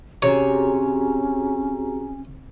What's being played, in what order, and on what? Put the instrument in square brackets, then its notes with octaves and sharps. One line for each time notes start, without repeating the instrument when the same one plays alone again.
[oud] C3 [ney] C#4 [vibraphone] F#4 G#4 A#5 [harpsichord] C#5